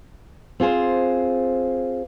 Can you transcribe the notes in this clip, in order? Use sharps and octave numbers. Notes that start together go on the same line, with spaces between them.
C4 F4 G#4 C5